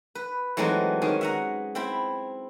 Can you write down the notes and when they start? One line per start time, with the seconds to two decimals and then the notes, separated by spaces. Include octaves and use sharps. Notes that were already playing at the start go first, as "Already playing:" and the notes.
0.15 B4
0.57 E3 F#3 G#3 A3 C4 D#4
1.02 D#3 C#4 G#4
1.21 E5 F#5 A#5
1.75 C4 E4 G5 B5